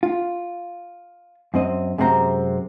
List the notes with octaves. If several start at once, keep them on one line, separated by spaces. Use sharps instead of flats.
F4
F#2 C4 D#5
F#2 C3 G#3 C4 F#4 A#5